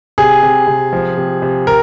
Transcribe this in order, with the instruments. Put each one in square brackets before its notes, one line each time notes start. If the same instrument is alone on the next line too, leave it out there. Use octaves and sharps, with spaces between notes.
[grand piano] C3 G#4
C3
C3
F3
C3
C3
C3 A#4